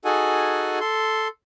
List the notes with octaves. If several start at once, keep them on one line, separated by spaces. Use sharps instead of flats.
D#4 F#4 G#4 A4 F#5 G#5
A4 C6